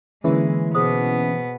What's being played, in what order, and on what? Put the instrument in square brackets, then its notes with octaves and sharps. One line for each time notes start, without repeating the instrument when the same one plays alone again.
[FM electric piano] D3 A#3 C#4 [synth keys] E3 [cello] G#3 [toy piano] G#4
[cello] B2 B3 [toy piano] G#4 C5 D#6